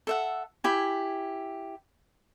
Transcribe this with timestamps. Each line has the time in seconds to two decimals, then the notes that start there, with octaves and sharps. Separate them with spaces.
0.07 A4 E5 F#5
0.64 E4 G4 G#5